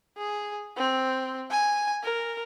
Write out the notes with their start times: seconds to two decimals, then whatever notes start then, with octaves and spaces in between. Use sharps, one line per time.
0.17 G#4
0.77 C4
1.50 G#5
2.03 A#4